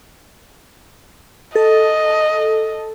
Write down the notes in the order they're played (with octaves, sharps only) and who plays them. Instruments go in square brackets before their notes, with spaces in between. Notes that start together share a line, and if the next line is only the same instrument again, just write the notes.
[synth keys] A4 [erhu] D#5